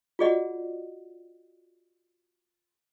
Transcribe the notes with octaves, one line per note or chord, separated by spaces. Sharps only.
F4 F#4 G#4 D5 D#5 F#5